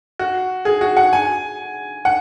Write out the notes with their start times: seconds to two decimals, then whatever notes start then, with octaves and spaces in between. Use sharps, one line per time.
0.19 F#4
0.65 G#4
0.81 F#4
0.97 F#5
1.13 G#5
2.05 F#5